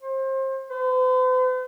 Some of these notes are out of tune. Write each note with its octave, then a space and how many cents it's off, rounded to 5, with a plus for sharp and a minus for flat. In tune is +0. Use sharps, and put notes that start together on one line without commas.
C5 +30
C5 -45